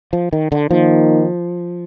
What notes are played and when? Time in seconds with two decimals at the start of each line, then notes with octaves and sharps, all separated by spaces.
0.13 F3
0.33 D#3
0.52 D3
0.70 D#3 F3 A#3 D#4